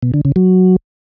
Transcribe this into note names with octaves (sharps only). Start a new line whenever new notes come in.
B2
D3
C#3
F#3